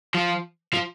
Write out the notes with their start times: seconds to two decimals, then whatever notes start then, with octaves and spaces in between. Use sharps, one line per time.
0.15 F3
0.74 F3